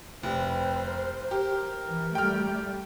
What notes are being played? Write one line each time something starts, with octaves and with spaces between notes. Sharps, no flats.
F1 C4 B4 C5
A#4
G4 A#4
E3
G3 A3 G5 F6